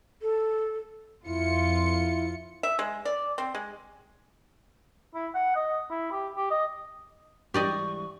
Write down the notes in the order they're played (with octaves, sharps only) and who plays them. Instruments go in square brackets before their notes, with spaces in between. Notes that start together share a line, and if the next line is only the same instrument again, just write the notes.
[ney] A4
[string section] F2 F4 C#7 [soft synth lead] E4
[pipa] E5
G#3
D5
C4
G#3
[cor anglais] E4
F#5
D#5
E4
G4
G4
D#5
[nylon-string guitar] G#2 E3 G3 [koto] G4 D5 D#5 [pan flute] C#6